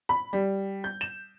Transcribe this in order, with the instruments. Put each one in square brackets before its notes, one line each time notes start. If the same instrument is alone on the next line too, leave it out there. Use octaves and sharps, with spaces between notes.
[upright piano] B5
G3
G6
E7